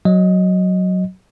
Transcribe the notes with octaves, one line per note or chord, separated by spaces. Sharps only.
F#3 D#5